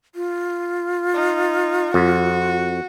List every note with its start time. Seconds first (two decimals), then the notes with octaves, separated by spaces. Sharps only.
0.15 F4
1.14 D#4
1.94 F2 F#4